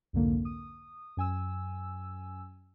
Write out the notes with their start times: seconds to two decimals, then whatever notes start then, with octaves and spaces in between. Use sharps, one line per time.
0.13 C2 F2 G#2 D3 A#3
0.45 D#6
1.17 F#2 G#5 E6